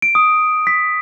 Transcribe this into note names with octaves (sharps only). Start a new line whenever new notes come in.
D7
D#6
B6